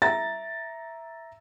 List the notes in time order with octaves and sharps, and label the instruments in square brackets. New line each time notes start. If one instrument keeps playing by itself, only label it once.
[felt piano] E5 A#5 A6